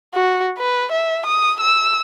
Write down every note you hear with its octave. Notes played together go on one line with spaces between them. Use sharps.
F#4
B4
E5
D#6
E6